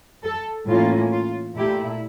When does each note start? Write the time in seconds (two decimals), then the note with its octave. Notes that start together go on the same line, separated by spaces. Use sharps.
0.25 A4
0.69 A2 E3 A#3 C#4 F4
1.13 F4
1.56 A#2 A3 E4 G4